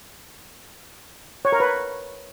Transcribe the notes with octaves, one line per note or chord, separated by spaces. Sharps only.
C#5
A#4
B4